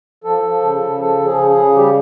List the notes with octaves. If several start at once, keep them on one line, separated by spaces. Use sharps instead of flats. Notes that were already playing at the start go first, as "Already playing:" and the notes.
F3 A4
F3
C#3
C#3
F3 A4
F3
G#4
C#3
G#4
C#3
G3 G4